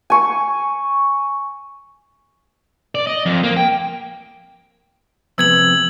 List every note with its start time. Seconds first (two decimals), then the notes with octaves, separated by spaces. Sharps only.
0.10 G#5 C#6
2.95 D5
3.07 D#5
3.26 F2
3.43 A#3
3.57 G5
5.38 F2 C3 B3 E6 G#6 F#7